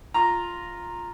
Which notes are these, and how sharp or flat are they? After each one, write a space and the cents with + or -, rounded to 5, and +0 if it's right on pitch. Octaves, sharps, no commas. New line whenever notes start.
F4 +5 A#5 +0